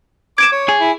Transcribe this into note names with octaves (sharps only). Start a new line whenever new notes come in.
D6 G#6 D7 E7
C#5
G#4
E4